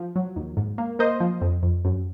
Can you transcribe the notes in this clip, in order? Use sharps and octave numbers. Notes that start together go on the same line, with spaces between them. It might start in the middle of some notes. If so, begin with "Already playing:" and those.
Already playing: F3
F#3
D#2
G#2
A#3
A#3 C5 D#5
F3
F2
F2
F#2